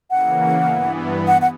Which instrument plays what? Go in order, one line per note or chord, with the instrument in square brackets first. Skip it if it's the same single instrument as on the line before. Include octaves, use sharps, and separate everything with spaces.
[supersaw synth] C#3 E3 A#3 [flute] F#5
[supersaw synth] G2 E3 B3
[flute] F#5
F#5